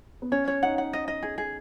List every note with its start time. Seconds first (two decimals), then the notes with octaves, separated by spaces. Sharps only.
0.22 B3
0.32 C#4 C#5
0.48 C#5
0.62 D#4 F#5
0.78 F#5
0.93 D#5
1.08 D#5
1.23 G#4
1.38 G#4